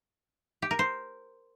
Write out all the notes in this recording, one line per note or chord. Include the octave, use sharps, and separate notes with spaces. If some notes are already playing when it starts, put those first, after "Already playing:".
G4
A#4
C5